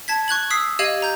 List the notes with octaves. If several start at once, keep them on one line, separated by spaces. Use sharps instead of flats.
A5 G#6 B6
C#6 F#6 G#6 F#7
D#6 E6 B6 C7
G4 D#5 F5 G#6 D#7 F#7
A#5 G6